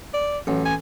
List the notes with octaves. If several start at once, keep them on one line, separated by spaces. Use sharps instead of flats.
D5
A1 F#3
G#5